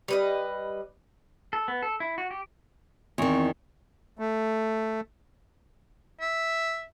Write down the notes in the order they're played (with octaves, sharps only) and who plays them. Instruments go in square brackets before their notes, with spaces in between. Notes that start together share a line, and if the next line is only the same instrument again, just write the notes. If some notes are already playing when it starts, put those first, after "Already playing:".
[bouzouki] G3 B4 D#5
[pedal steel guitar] A4
B3
A4
E4
F#4
G4
[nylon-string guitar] E2 D#3 [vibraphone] C4 C#6
[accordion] A3
[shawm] E5